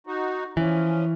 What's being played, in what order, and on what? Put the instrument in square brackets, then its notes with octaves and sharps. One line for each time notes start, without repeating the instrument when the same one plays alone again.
[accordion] D#4 F#4
[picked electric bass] E3 [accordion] F3 C#4